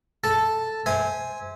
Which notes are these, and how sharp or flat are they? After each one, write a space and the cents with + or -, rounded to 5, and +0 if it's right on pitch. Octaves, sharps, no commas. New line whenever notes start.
A4 +0 A5 +0
C5 -5 E5 -30 G#5 +0